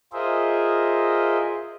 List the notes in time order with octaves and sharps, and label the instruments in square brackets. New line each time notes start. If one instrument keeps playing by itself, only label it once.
[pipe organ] F4 G#4 A#4 C5 D#5 E5